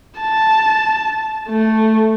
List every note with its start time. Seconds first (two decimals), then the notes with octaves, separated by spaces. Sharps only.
0.20 A5
1.49 A3